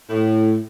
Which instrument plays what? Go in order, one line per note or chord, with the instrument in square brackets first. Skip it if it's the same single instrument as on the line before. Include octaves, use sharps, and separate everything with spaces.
[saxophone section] A2